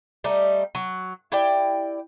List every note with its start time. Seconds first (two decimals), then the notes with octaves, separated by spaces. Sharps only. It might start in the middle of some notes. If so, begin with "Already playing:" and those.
0.24 G3 A3 D#4
0.75 F#3
1.32 E4 G4 D5 G5